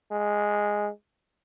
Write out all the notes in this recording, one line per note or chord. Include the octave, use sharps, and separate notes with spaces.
G#3